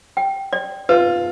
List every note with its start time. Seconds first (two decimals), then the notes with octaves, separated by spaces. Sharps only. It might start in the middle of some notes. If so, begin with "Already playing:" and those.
0.17 G5
0.53 D5
0.89 F4 B4